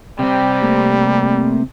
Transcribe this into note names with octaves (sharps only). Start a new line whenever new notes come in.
C3 G3 C4 G5
A3 A#3